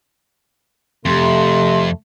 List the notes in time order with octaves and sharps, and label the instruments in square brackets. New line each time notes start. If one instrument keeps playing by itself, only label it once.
[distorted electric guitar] F2 [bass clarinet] C3 [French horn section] A3 [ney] C6